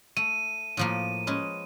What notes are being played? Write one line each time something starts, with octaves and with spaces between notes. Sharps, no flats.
A3 D#7
A2 F3 A#3
G#3 C#4 B4